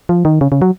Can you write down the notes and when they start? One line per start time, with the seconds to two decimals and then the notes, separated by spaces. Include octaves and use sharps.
0.09 F3
0.25 D#3
0.41 C#3
0.52 C#3
0.62 F#3